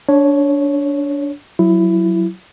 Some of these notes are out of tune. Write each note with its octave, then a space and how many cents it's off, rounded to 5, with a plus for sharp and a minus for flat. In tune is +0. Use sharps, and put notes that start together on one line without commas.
D4 -25 C#5 +0
F#3 +0 E4 +15